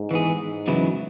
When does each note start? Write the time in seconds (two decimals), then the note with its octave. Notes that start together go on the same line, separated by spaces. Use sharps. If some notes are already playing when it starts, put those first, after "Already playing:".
Already playing: G#2
0.11 E3 B3 G#4
0.39 G#2
0.67 E2 C#3 F#3 B3 E4